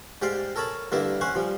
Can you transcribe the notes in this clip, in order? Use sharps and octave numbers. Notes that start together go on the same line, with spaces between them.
G#2 G4 D5 F5 C6
A4 A#4 C#5 A5 B5
G2 D3 A#3 E4 E5
C#4 C5 F#5 C#6
F3 G3